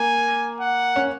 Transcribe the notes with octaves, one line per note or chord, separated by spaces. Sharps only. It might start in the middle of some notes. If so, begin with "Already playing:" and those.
Already playing: A#3 G#5
F#5
C#4